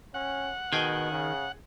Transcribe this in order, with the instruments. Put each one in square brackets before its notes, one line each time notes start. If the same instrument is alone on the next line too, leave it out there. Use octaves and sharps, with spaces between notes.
[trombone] C#4 [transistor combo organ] F#5
[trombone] B2 [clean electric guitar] D#3 [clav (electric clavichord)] G#4 G5 G#5
[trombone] C#3